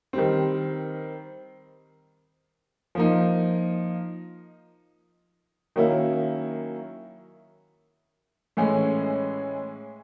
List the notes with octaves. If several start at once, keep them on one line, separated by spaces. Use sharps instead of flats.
D#3 G3 C4
F3 A#3 D#4
D#3 F#3 A#3 C#4 E4
A2 E3 G#3 C#4